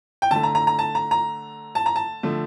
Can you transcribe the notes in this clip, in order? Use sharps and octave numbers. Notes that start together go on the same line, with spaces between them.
G5
D3 A3 A5
A#5
A#5
A#5
A5
A#5
A#5
A5
A#5
A5
D3 F3 A3